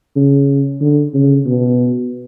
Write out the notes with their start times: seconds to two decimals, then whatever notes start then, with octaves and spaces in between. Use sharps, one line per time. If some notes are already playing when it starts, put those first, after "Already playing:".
0.16 C#3
0.80 D3
1.14 C#3
1.45 B2